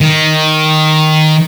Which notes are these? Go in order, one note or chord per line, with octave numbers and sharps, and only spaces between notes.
D#3